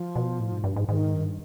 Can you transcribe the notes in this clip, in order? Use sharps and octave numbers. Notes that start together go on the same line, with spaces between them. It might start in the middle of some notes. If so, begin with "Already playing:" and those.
Already playing: F3
B2
A2
G#2
G2
G#2
G#2 D#3
G2